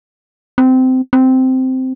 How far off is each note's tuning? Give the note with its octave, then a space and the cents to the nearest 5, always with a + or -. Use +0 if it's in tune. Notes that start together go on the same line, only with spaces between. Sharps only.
C4 -20
C4 -10